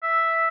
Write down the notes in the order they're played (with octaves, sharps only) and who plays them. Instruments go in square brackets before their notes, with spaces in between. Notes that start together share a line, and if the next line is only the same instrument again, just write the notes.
[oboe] E5